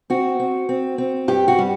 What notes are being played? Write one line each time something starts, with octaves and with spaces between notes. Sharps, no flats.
C4 F#4
C4
C4
C4
G2 G4
F#4
G3